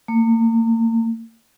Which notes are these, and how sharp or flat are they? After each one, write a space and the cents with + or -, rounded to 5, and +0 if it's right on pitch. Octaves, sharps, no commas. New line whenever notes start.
A#3 -40